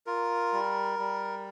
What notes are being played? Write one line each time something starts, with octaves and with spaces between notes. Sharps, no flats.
F4 A#4
G3
G3